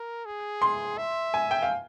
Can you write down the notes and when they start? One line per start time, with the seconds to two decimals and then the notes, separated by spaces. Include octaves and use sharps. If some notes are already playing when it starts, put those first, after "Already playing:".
Already playing: A#4
0.25 G#4
0.62 C6
0.98 E5
1.34 G#5
1.51 G5
1.62 F5